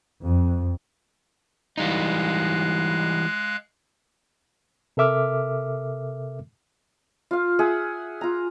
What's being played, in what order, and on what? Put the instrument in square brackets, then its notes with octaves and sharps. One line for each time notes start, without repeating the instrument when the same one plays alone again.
[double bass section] F2
[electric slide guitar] E3 G3 D#4 [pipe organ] G#3 F5 F#6
[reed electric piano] C3 A4 A#4 E5 D6 F6
[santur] F4 F5
G#4 E5 F#5
F4 A#5